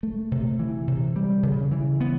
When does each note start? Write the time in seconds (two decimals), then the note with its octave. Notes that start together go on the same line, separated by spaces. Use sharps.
0.03 A3
0.32 C3
0.59 E3
0.88 C3
1.16 G3
1.43 C#3
1.71 E3
2.00 B3